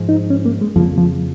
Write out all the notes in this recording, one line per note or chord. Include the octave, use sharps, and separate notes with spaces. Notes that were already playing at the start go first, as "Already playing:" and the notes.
Already playing: G#2 F3 G#3
D#4
C#4
A#3
G#3
F2 C#3 F3 A#3
F3